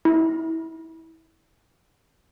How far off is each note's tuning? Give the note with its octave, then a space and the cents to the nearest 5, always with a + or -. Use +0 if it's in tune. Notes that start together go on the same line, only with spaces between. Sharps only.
E4 -25